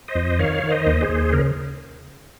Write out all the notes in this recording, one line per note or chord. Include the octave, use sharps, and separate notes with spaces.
C5 D#5
F2
D#3 C#5 F5
D#3
C5 D#5
D#2
G#4 C5
D#2
C#3 A#4